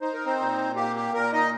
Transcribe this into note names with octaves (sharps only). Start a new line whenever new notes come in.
D#4 C5
A#4
C4 C5
A#2
A#3 G4
G4
A#2 A#3 A#4
D#4 D#5